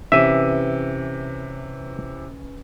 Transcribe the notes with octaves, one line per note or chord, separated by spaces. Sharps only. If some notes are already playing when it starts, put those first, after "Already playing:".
C3 E3 C#4 B4 E5 D#7